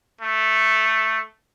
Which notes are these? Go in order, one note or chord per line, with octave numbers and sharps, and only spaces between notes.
A3